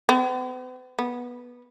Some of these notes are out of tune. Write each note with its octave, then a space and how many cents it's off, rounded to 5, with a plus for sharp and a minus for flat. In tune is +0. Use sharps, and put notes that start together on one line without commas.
B3 +45
B3 -15